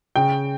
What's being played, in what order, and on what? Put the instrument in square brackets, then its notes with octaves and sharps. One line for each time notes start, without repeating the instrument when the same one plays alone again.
[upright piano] C#3 G5